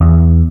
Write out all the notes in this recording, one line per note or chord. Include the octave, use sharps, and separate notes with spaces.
E2